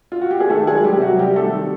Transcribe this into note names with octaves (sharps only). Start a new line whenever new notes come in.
F4
F#4
G4
G#4
D#3 A3 A4
G#3 G#4
F#3
G3 G4
C3
F#3 F#4
C3 G3 G4
A3 A4
D#3